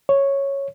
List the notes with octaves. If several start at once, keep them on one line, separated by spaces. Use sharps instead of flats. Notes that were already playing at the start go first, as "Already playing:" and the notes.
C#5